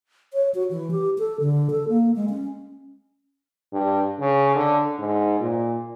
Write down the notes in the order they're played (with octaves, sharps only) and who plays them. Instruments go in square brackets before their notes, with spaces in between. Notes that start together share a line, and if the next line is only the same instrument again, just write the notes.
[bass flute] C#5
F#4
E3
G4
A4
D3
A4
A#3
G#3
C#4
[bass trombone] G2
C#3
D3
G#2
A#2